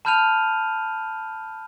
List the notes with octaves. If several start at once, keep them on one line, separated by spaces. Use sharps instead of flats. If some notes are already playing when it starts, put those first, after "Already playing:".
A5 B5 F6 G6 D#7 F7